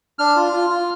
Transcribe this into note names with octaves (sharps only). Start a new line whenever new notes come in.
D4 F6
F4
F4
F4